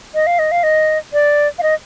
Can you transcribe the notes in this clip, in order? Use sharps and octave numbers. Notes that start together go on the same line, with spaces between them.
D#5
F5
D#5
F5
D#5
D5
F5
D#5